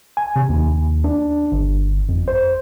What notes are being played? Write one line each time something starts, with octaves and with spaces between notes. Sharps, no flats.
G#5
C3
D#2
D4
G1
F2
C5